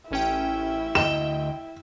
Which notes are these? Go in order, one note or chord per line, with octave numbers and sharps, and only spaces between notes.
A1 C#4 E4 E5 G5
D2 D#5 G5 E7